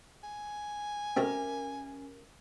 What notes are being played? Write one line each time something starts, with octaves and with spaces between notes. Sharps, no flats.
G#5
B2 A3 C4 C#4 G4 A#4 E5